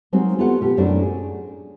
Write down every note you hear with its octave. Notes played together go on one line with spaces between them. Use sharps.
F#3 G#3 A#3 C4 D#4 F#4
B3 F4 G4 A4 F#5
B2 G4
F#2 A2 C4 D4 F#4 A#4
G#4